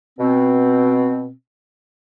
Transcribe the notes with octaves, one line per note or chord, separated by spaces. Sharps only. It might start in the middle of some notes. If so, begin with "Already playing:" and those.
B2 C4